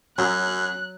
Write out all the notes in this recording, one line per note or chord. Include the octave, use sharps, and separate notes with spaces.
F#2 F#3 F#6